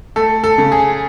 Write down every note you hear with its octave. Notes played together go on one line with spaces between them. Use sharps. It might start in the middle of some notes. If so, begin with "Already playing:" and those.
A3 A4
A4
C#3
G#4